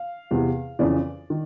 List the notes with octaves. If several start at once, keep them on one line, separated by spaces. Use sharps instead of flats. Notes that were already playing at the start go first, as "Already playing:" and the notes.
Already playing: F5
E2 C3 E3
F2 C#3 E3 D5
D#3